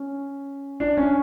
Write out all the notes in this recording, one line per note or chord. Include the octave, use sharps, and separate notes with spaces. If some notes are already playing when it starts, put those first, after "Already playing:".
Already playing: C#4
D4
C#4